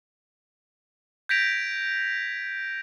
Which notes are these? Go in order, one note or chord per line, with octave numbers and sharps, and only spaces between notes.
G6 G#6 A#6 B6 D7 F7